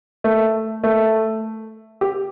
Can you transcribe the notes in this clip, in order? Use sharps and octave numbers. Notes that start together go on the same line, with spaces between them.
A3
A3
G4